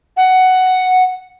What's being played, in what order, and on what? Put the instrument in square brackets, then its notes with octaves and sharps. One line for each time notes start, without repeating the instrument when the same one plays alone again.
[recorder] F#5